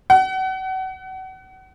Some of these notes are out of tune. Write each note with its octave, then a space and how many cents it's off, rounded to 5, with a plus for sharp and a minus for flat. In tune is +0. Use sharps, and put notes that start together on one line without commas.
F#5 +35